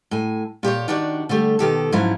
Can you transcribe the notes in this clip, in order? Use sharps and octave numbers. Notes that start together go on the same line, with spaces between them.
A2 G#5
A#2 G4 G#4 C#5
D#3 D4 F#4 G4 D5
D3 G3 A3 G4
B2 D#3 G4 A4
G#2 F3 F#3 C#4 E4